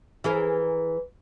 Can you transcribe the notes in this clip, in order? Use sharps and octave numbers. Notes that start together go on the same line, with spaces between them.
E3 G#4 A#4